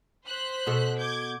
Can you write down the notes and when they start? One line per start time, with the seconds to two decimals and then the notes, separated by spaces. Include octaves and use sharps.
0.25 C5 F#6 B6
0.66 B2 F#4 A4
0.98 D6 G6 G#6